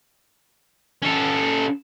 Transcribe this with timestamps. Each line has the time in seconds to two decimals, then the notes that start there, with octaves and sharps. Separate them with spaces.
1.02 C#4 A4